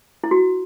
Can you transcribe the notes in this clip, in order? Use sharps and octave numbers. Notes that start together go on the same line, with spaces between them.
E4
F#4